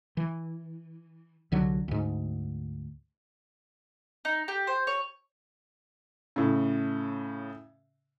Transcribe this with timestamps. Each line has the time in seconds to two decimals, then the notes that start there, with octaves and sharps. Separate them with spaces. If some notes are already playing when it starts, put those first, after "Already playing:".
0.17 E3
1.52 C2 D3 F#3
1.88 D2 G#2
4.25 D#4
4.48 G4
4.67 C5
4.87 C#5
6.36 A2 C#3